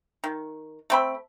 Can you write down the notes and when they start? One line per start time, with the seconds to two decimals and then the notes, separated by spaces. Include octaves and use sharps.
0.24 D#3
0.90 A3 C4 B5